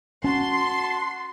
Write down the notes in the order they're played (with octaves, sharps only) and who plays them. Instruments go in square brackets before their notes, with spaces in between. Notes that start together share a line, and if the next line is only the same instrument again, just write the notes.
[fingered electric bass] C#4 [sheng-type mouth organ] F#4 A5 [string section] C6